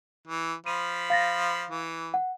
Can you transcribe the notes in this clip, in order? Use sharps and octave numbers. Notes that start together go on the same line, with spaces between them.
E3
F3 B5 D#7
F5 A6 A#6
E3
F#5